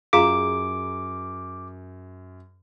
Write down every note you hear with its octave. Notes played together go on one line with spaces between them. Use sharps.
F#2 F4 G#4 F5 A#5 D6